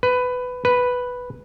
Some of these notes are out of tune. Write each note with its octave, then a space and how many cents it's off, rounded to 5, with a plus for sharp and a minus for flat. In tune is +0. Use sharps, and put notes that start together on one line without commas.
B4 +15
B4 +0